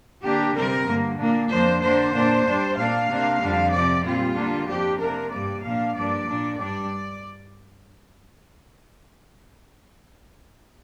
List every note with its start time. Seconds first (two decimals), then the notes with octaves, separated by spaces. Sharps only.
0.22 D3 A#3 D4 G4
0.54 C3 G3 C4 A#4
0.86 G2 D3 A#3
1.17 A#2 A#3 D4
1.49 F2 F3 A#3 D4 C5
1.81 D3 A#3 D4 C5
2.13 A#2 A#3 D4
2.45 G2 G3 D4
2.76 A#2 A#3 D4 F5
3.08 C3 A#3 D4
3.40 F2 D3 G3 D4
3.72 C3 F3 C4 D5
4.04 A#2 G3 C4 F4
4.35 D3 G3 A#3 D4
4.67 F2 F3 D4 G4
4.99 C3 A#3 D4 A#4
5.30 G2 G3 A#3 D5
5.62 A#2 F3 A#3 D4 F5
5.94 G2 F3 A#3 D4 D5
6.26 A#2 A#3 D4
6.57 G2 G3 D4 D5